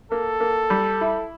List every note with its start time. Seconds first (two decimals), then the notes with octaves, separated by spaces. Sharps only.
0.12 A#3 A4
0.40 A#3
0.70 G3
1.01 E4